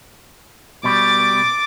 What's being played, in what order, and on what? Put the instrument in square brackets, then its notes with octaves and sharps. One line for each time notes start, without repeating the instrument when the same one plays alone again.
[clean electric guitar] B2 G3 [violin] D6 A6